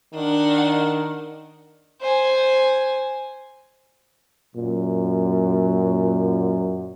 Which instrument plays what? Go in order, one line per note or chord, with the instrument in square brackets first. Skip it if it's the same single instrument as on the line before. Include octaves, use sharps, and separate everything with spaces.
[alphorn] D#3 [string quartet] D4 F#5
[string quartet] C5 G#5
[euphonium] F#2 [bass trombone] A#2